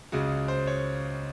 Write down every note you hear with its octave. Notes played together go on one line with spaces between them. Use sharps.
C#2 C#3 G#3 F#4
C5
C#5